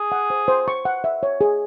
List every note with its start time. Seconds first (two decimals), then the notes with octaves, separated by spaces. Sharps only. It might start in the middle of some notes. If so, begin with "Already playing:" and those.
Already playing: G#4
0.12 F#5
0.30 C5
0.48 C5
0.68 C#6
0.85 F#5
1.04 E5
1.23 C#5
1.41 G#4